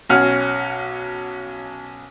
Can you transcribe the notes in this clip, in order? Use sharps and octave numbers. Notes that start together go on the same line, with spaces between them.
B1 C#4 F#5 F6